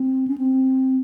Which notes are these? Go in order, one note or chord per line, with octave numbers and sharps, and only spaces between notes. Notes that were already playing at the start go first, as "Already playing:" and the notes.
Already playing: C4
C#4
C4